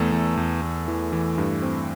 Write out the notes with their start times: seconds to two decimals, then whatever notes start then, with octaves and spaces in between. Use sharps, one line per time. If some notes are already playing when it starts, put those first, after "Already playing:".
Already playing: E2 A3 A4
0.12 E2
0.37 E2
0.62 E2
0.88 E3
1.13 E3
1.38 G2
1.62 C4